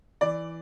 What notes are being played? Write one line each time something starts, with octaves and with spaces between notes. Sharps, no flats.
E3 D5